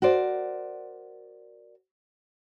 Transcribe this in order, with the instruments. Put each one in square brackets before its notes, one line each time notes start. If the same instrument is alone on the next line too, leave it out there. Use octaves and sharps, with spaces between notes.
[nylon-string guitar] F#4 A#4 C5 D5